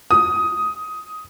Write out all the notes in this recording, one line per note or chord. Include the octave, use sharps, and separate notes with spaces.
D#6